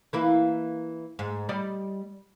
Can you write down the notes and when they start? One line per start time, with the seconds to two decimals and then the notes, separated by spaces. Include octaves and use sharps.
0.13 E3 A#3 E4
1.19 G#2
1.49 G3 D5 D#5